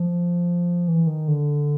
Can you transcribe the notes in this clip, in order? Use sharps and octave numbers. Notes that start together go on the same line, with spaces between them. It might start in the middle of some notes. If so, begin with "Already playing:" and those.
Already playing: F3
E3
D#3
D3